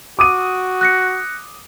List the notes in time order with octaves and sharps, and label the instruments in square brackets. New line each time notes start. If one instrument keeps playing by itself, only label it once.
[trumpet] F#4 [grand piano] D6 D#6 D#7
[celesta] F#6 A#6 C#7